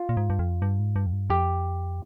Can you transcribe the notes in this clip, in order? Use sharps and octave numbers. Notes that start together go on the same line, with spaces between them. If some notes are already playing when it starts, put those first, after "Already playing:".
Already playing: F4
A#2
G#2
G2
F2
G2
G#2
G2
F2
G2
F2 G4